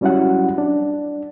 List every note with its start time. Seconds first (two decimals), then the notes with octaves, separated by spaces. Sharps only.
0.01 F#3 G3 C#4 E4 F#4 F#5
0.58 D4